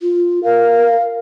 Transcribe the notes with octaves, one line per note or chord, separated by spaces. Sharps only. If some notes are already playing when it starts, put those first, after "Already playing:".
F4
A#4 F5